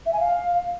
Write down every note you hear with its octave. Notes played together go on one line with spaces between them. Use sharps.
E5
G#5
F5